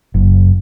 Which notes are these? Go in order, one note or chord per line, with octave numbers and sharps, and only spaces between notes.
F#1